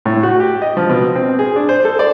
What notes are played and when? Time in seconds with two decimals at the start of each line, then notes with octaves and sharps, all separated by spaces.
0.06 A2
0.23 F#4
0.40 G4
0.62 D#5
0.77 F3
0.90 B2
1.16 C4
1.39 G#4
1.56 D4
1.69 C5
1.85 A4
1.99 D5